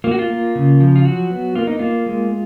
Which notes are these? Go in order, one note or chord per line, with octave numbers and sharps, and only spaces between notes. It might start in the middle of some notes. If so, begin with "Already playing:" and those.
A#3 F4
F#4
F4
A#3
C#3
F3
F4
F#3 F#4
B3
A#3 F4
D#4
A#3 F4
G#3